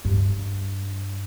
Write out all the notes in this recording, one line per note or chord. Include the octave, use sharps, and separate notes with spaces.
G2